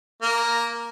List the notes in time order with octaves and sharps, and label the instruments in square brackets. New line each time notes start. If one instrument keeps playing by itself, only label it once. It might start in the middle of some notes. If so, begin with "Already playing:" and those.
[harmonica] A#3